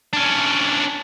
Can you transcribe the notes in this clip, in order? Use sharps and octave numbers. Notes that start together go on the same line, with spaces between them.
C#4 D4